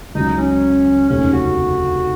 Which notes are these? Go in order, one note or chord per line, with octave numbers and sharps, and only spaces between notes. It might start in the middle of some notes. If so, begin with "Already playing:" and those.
C#2 C#3 F#3 D#4
C#4
F1 D#2 C#3 G#3 C#4
F#4